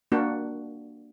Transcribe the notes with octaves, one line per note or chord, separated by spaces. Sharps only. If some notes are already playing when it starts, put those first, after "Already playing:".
A#3 D4 F#4